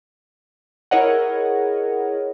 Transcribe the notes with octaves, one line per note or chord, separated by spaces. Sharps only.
E4 G#4 A#4 C#5 D#5 F#5